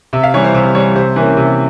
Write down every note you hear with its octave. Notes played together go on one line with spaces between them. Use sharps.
C3 E5
F5
E3 G3 C#5
C5
C3 C5
E3 G3 C#5
C3 C5
E3 A#3 C#4
C3